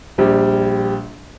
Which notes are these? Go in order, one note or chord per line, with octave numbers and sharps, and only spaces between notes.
A#1 G3